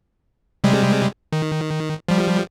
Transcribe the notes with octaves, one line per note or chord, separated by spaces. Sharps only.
C3 G3 G#3
D#3
F3 G3